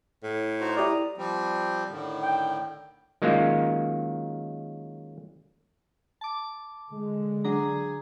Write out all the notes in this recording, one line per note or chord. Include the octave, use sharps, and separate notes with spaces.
A2
D#4 F#4 C5
E4 G4 D5 A#5 D#6
F3 G3 C4
A2 D3 D#3
G5
D#3 F#3 G#3 A#3 C#4 F4
A5 D6
D3 G#3
F#3 D4 G#4 A#5